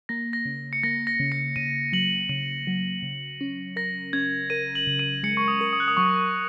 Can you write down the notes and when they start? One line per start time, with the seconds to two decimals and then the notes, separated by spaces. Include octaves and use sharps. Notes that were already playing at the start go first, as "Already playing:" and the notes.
0.09 A#3 A#6
0.33 A#6
0.45 C#3
0.73 C#7
0.83 A#3 A#6
1.07 A#6
1.20 C#3
1.32 C#7
1.56 C#3 D#7
1.92 F#3 F#7
2.29 C#3 D#7
2.67 F#3
3.03 C#3
3.41 C#4
3.76 A#4 A#6
4.13 C#4 G#6
4.50 A#4 D#7
4.75 F#7
4.87 C#3
4.99 D#7
5.23 G#3 C#7
5.37 C#6
5.48 D#6
5.61 A#4
5.73 D#6
5.80 F#6
5.88 D#6
5.97 F#3 C#6